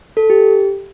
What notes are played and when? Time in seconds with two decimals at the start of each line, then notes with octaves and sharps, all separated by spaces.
0.17 A4
0.30 G4